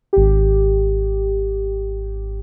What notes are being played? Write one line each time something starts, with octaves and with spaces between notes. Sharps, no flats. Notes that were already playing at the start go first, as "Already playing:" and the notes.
G#1 G4